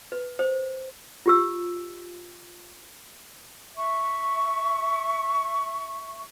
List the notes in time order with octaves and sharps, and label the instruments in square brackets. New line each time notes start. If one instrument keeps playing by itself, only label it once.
[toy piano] B4
C5
F4 G4 E6
[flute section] E5 C#6